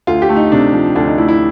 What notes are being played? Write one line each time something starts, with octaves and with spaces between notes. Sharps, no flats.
D2 F4
G4
A3
D#4
C3 D4
F3
D2 D4
D#4
A3 E4
E4